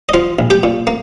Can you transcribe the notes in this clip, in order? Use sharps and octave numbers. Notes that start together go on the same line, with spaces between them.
D#5
F3 F4 F5
A#1
G4 G5
A#2
A#3